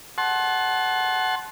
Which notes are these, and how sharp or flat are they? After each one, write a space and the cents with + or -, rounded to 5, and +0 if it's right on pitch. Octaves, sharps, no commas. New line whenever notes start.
F#5 +10 A5 -20 C6 +25